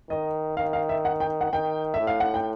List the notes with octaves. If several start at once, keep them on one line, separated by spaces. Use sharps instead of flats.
D#3 D#5
D#3 F5
F5
E5
F#5
G5
F#5
D#3 G5
E5
A2
F5
F#5
G5